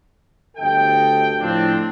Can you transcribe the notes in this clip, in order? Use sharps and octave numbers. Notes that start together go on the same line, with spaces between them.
G1 D2 A4 D#5 G5
A2 F3 C4 D4